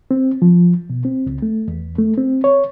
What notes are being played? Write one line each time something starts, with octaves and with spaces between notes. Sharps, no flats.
C4
F3
B2
C4
C#2
A3
E2
A3
C4
C#5